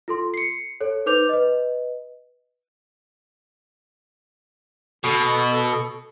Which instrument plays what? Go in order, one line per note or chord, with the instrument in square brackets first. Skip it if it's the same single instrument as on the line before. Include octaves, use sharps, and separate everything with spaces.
[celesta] F4 A4 C6
C7 C#7
A4 C#5
D#4 B4 C5 D6 G6 F7
B4 D#5
[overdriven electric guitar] B2 [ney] A4